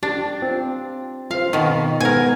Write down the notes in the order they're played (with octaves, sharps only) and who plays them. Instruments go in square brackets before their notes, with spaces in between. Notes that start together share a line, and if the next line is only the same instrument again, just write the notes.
[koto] D4 [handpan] G4
[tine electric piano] C4 [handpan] F4
[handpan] F4 C5 [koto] F5
[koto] B2 D#3 [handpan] D#4
[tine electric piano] G#2 B3 [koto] A#4 G#5